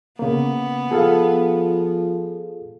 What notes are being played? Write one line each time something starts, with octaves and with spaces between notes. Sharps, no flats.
C#3 A#3 B3
F3 G#4 A4 F5